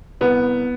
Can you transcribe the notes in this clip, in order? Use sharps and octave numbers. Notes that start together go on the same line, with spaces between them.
C2 B3